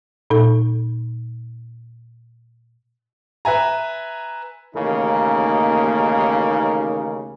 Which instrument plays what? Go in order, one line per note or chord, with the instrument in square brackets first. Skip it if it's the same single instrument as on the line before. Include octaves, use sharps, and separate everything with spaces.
[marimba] A#2 D#4 A4
[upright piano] B4 E5 G#5 A#5
[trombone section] A1 D#2 C#3 A#3 D#4